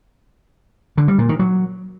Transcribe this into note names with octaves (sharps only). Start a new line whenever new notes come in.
D3
G3
A#2
D#3
F#3